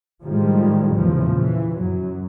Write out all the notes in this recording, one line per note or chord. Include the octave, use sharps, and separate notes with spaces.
A2 D#3 F3 G3 G#3
E2 A#2 C#3 E3 F3
E3
F#2 F#3